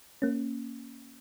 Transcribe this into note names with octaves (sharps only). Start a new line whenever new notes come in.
A#3 C#4